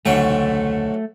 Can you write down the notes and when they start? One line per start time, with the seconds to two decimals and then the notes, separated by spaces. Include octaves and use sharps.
0.06 E1 C#2 G#2 D3 F#3 A3 G5